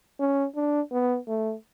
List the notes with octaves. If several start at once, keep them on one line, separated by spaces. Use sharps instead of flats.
C#4
D4
B3
A3